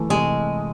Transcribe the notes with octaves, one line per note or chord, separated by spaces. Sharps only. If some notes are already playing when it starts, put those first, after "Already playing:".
Already playing: E3 A3
C3 G#3